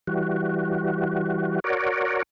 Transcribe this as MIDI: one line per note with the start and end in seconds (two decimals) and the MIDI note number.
0.07 1.60 52
0.07 1.60 55
0.07 1.60 66
1.64 2.23 66
1.64 2.23 70
1.64 2.23 73
1.64 2.23 74